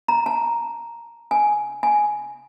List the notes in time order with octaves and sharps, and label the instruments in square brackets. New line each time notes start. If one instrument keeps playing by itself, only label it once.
[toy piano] A#5
A5
G#5
G#5